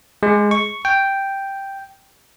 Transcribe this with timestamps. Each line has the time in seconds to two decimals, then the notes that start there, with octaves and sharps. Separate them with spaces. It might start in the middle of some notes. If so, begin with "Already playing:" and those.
0.23 G#3
0.51 C#6
0.85 G5